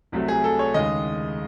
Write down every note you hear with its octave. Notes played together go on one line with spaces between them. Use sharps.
C2 C3 F#3 A3
G#4
A4
C#5
D#2 C#3 G#3 D#5